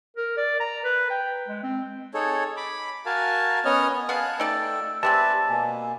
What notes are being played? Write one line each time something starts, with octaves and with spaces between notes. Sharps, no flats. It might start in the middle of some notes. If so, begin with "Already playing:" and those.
A#4
D5
A#5
B4
G5
G#3
C4
D#4 G#4 A4 C#5
B5 D6
F#4 A#4 F5 G#5 A5
B3 C#4 C#5 D#5 F6
B3 G#4 F5 G#5 A5 F#6
A3 D#4 D5 G5 A5 E6
G3 G#3 C4 G4 B4 E5 A5
B2 A#3 G#5